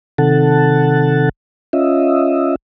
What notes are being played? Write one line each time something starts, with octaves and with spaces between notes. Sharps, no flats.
C3 D#3 A4 F#5 A5
C#4 F4 D#5 E5